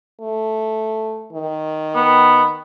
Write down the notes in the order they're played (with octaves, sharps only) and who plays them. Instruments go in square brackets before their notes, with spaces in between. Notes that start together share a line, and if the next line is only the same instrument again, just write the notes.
[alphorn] A3
D#3
[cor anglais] B3